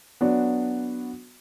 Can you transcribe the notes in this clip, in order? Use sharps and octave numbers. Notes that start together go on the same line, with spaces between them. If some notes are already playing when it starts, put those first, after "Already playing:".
F#3 B3 D4 F#4